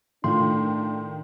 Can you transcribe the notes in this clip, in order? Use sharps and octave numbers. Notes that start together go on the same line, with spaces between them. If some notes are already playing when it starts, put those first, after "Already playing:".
A2 D#3 D4 F4 C6